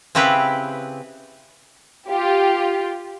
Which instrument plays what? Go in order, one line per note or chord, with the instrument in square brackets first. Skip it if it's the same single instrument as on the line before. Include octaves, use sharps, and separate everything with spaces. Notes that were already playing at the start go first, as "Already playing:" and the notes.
[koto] C#3 C4 E4 G4 B4
[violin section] F4 G4